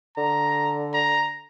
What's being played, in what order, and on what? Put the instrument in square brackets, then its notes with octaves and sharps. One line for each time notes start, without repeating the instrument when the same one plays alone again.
[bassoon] D3 [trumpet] A#5
[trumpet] A#5